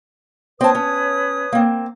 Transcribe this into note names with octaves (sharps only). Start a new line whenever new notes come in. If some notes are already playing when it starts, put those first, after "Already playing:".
C4 B4 C#5 A5 D#6
C#4
A#3 C4